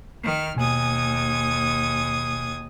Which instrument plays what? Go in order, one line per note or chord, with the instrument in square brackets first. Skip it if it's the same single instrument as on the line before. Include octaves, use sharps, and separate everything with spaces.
[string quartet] D#3 F6
[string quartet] D#2 D#6 G#6 [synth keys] B2 G#5